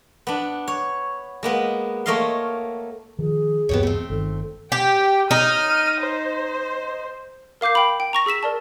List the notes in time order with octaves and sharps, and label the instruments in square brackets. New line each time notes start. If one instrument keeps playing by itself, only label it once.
[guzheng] B3 D4
C#5
G#3 A#3 B3
A3 A#3 C#5 D#5 F5 C6
[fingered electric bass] D#3 F3 [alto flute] G#4
[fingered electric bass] D#1 G2 E3 [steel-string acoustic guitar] B3 G4 C#5
[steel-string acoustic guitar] A3 C4
[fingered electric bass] G1 D#3 [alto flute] A4
[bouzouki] G4 [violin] G5
[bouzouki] D#4 [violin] F6 D#7
[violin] C5
[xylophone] A#4 F5 D6 G6 C7
G5 B5
G5
A#5 C#6 A#6
G#4 E6 B6 E7
A#4 D5 A5